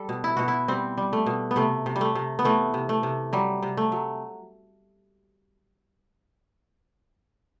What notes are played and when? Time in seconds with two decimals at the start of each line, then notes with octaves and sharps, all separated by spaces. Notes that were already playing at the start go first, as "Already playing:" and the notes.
Already playing: G3 A4
0.09 B2
0.24 E4
0.37 B2 F#4
0.48 E4
0.68 G3 C4
0.98 G3
1.13 A3
1.26 B2
1.51 B3
1.56 C3 A3
1.86 C3
1.96 G3
2.01 A3
2.15 C3
2.39 B3
2.45 E3 A3
2.74 C3
2.89 A3
3.03 C3
3.33 F#3 G3
3.62 C3
3.77 A3
3.92 F#3